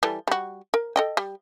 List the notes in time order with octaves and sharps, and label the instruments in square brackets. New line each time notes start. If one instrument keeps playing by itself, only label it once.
[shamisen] E3 G3 A4
G3 F#4
A#4
A4 D#5 G5
G3